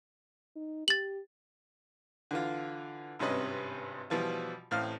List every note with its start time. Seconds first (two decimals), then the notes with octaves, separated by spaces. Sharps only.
0.56 D#4
0.88 G4 A6 F#7
2.31 D3 E3 F4
3.19 G#1 G2 C3 C#4 B4 D#5
4.10 B2 E3 F3 G3 F4
4.71 A1 A2 C4 F5 F6